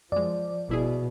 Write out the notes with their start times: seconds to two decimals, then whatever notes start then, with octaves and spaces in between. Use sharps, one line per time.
0.12 F#2 F3 G#3 D5
0.69 G1 B2 E4 G#4